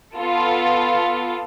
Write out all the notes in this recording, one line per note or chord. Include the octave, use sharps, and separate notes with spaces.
B3 F4 A4